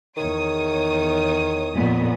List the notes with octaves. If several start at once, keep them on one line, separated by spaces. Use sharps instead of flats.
E2 D#3 C#5 D#6
F2 A#2 B3